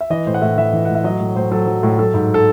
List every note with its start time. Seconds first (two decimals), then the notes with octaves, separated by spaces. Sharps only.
0.01 E5
0.10 E3 D#5
0.27 A2 C5
0.34 F#5
0.42 A2 E5
0.57 E3 E5
0.73 E3
0.85 A2 F#5
0.95 E5
1.04 F#3 D#5
1.20 A2
1.36 A2 C5
1.51 F#3 A4
1.67 F#3
1.83 A2
1.99 F#3 A4
2.14 G#2
2.34 A4